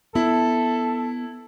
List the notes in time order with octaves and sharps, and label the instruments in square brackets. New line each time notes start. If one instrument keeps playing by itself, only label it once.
[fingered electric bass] B3 [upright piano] E4 [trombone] A4